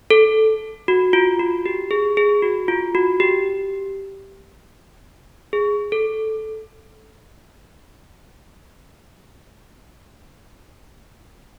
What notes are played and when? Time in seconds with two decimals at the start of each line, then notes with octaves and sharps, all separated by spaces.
0.10 A4
0.88 F#4
1.13 F4
1.40 F#4
1.66 G4
1.91 G#4
2.17 G#4
2.42 F#4
2.68 F4
2.95 F#4
3.20 G4
5.53 G#4
5.92 A4